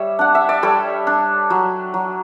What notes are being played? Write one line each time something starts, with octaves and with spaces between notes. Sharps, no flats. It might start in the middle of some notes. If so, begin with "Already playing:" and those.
Already playing: G3 C#5 E5
D4 F#5
E5
D5
G3 A4 C#5
D4
F#3
F#3